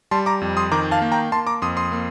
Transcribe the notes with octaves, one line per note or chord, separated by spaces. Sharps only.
G3 A5 C6
A#5 D6
F2
C6 D#6
D#3 A#5 D6
F5 A5
A#3
G5 A#5
A#3 A5 C6
A#5 D6
F2 C6 D#6
C6 D#6
A#3